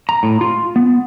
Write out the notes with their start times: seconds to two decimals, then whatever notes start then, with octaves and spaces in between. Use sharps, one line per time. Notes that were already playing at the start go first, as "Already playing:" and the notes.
0.09 A#5
0.23 A2
0.41 F4
0.76 B3